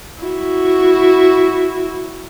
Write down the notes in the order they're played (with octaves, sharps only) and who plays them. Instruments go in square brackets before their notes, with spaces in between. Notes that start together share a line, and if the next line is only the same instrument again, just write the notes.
[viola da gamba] E4 F#4